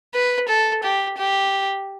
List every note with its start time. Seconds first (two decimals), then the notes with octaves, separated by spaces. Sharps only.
0.15 B4
0.49 A4
0.84 G4
1.18 G4